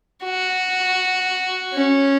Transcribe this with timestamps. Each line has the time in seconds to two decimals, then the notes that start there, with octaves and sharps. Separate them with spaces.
0.24 F#4
1.74 C#4